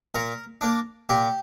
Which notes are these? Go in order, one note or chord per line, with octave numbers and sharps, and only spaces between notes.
A#2 A#4
A#3 D4
A#2 G4